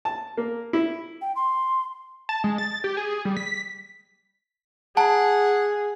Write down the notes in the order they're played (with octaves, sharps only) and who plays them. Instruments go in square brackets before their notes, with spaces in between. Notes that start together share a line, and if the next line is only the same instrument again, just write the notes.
[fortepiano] A5
A#3
E4
[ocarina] G5
C6
[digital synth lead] A5
G#3
A6
G4
G#4
G3
B6
[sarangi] G#4 [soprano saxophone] F#5 [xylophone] A5 A#5